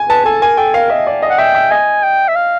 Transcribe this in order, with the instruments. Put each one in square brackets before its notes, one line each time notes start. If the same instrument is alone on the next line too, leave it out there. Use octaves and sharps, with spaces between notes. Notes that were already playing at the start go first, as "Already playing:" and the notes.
Already playing: [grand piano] G#5
[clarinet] B4 [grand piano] A5
[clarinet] A4 [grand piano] G#5
[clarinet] A#4 [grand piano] G#5
[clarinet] A4 [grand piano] G5
[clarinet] A#4 [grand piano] F5
[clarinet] D#5 [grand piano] E5
[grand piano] D5
D#5
[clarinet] F#5
[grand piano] E5 [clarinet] G5
[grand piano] E5
[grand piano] D#5 [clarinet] G#5
[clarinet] G5
E5
F5